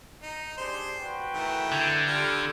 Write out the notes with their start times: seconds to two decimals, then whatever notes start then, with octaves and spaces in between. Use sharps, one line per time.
0.22 D#4
0.57 D4 G4 G#4 C5 C6
0.98 F#4 B4 G5
1.34 D#3 E3 A3
1.72 D3 G6 G#6
2.07 G3 F4 A4 F6